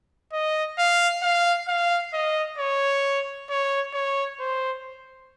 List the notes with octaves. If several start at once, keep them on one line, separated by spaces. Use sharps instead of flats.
D#5
F5
F5
F5
D#5
C#5
C#5
C#5
C5